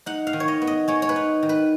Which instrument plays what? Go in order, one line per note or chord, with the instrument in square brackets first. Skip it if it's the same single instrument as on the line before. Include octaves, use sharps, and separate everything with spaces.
[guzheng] D#4 F#5
F5
D#3
C#5
D#5
B3
D#5
G#3 C#5
C#5
B4
D#4
D#3
B4